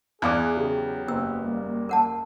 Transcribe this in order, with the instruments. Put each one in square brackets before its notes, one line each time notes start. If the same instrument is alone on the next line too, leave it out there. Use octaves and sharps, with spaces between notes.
[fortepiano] E2 [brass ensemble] G#4 [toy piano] D5 F5 G#5 [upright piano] D6 F#6
[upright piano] C#3 [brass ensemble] F#3 B3 G4
[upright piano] F#1 [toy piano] E6
[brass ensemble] G3 A#3
[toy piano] A#4 F#5 A5